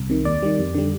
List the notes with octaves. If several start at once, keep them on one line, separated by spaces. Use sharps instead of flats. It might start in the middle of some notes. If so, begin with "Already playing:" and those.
Already playing: C2
C3 D#3
D#2 D5
D#3 G3
F2
D3 G3